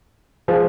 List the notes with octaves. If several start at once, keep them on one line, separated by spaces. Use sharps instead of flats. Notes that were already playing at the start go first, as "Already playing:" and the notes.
F3 G#3